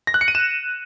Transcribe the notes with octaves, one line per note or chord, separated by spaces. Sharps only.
A#6
F#6
C#7
D#7
E7